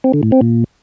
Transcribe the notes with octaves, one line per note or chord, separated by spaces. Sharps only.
C4
D3
A2
C4
A#2